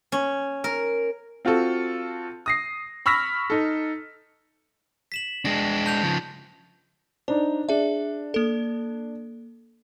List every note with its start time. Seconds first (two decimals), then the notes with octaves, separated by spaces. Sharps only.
0.12 C#4
0.64 A#4
1.45 C4 F4 F#4 A4
2.46 D#6 A#6 C7
3.06 B5 C#6 E6 F6 A#6 B6
3.50 D#4 A4
5.12 B6 E7 F#7
5.45 G#3 D4 A5 A#6
5.86 A5 G6 F7
6.03 C#3 F3
7.28 D4 D#4 C5
7.69 D4 G#4 E5
8.34 A#3 A4